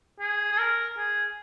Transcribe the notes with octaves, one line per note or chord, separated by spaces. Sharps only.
G#4
G#4
A#4
G#4